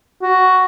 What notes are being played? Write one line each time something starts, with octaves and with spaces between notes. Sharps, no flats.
F#4